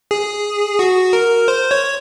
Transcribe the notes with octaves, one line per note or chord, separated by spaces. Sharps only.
G#4
F#4
A#4
C5
C#5